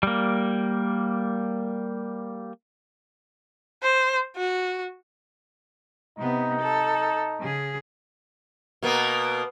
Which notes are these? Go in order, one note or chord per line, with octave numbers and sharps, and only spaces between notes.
G3 A#3
C5
F#4
C3 B3 D#4
A4
C#3 G#4
B2 A#3 B3